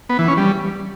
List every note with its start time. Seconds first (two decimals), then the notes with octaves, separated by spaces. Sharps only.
0.09 B3
0.19 E3
0.28 C#4
0.37 G3